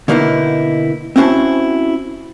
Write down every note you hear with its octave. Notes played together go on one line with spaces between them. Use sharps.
B2 D3 A#3 B3 D#4 E4
C4 C#4 E4 F#4 C5 A5